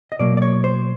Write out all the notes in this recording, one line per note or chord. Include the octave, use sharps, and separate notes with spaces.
D#5
B2 F#3 A#3 D5
D5
C#5
C5